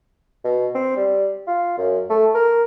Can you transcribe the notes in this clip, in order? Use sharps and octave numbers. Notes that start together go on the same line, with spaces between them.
B2
C4
G3
F4
F#2
A3
A#4